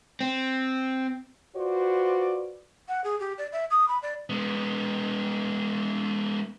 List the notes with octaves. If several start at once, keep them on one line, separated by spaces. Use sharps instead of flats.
C4
F4 F#4 B4 C5 D5
F#5
G#4
G4
D5
E5
D#6
B5
D5
G#3 B3